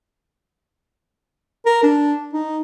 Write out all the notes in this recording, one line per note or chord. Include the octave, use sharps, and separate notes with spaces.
A#4
D4
D#4